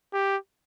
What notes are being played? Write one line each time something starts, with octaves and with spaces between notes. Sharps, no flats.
G4